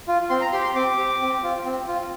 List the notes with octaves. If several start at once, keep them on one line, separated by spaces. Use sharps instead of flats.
F4
C4 C6
A#5
G4 C6
C6
C4 D6
G4
C4
F4
C4
F4